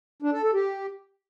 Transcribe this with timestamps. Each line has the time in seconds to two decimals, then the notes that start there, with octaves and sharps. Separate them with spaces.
0.22 D4
0.33 A4
0.43 A4
0.54 G4